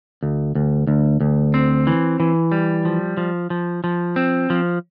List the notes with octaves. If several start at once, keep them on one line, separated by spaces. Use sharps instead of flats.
D2
D2
D2
D2
C4
E3
E3
G3
F3
F3
F3
F3
C4
F3